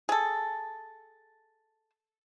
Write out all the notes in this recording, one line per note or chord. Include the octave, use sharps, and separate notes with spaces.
G#4 A4